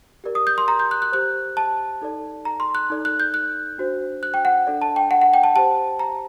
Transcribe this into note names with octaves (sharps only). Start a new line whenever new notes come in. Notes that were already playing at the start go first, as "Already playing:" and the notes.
G4 A#4 D5
D#6
G6
C6
A#5
G6
F#6
F#6
G4 C5 F#6
A5
D#4 A4 D5
A#5
C6
F#6
D#4 A4 D5
F#6
G6
F#6
D4 F#4 C5
F#6
G5
F#5
D4 A4 D5
A5
G5
F#5
F#5
G5
A5
G4 C5 A5
A#5